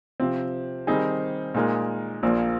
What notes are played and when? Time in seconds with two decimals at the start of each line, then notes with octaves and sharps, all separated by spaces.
0.20 C3 F3 C4
0.87 D#3 G3 C4 D#4 G#4
1.54 A#2 G#3 D#4 A#4
2.23 A#1 A#2 F3 A#3